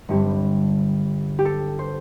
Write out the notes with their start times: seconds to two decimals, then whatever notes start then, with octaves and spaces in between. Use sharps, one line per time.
0.08 G1 G2 D3 G3 C4 G4
1.39 G4
1.45 A4
1.79 C5